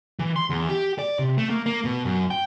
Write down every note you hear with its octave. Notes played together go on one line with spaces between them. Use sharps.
E3
C6
E2
G4
D5
C3
A3
A#3
A#3
B2
F#2
G5